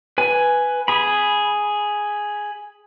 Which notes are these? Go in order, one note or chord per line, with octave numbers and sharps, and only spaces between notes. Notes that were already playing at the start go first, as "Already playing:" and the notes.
B4 G#5
G#4 B5